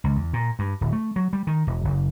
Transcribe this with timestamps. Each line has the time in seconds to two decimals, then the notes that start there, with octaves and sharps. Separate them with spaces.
0.04 C#2
0.16 E2
0.33 A#2
0.59 G2
0.81 D1
0.93 A3
1.16 F#3
1.33 G3
1.47 D#3
1.67 E1
1.84 F#1